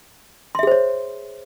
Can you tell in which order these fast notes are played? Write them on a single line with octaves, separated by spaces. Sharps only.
C6 E5 G#4 C5 C#5